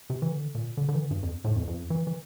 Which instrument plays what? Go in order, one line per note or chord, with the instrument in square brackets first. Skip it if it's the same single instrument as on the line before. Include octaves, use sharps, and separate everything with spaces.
[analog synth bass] C3
E3
D3
A#2
D3
D3
E3
D3
G2
F2
A2
F2
F2
E3
E3